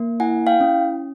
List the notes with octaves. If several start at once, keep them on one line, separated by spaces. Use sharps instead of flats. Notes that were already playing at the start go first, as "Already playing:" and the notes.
Already playing: A#3
E4 F#5 G#5
F5 G5
C#4